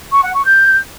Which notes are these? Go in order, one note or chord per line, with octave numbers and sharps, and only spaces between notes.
C#6
F#5
C#6
G6